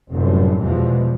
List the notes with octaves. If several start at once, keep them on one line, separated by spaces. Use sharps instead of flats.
F1 F#2 A2 G3
E2 B2 E3 F3 G3 G#3